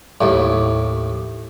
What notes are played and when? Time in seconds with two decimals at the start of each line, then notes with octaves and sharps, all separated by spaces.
0.21 D#2 A2